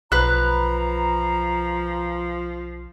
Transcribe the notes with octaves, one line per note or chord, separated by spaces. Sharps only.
B1 F3 B4 A#5 F#6